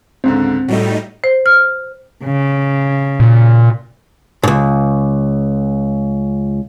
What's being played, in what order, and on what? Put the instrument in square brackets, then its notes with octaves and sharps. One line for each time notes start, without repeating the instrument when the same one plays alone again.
[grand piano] C#2 G#2 D3 [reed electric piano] C4
[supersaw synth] A2 G3 D#4 [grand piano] A3 F#4
[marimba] C5
F6
[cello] C#3
[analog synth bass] A#2
[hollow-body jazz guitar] C#2 G#2